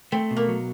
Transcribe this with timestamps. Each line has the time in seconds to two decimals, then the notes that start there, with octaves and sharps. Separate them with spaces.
0.12 A3 C4
0.31 B2
0.37 A#3
0.49 F#3